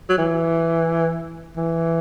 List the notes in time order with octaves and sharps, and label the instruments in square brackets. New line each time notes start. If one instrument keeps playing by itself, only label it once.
[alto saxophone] F#3
E3
E3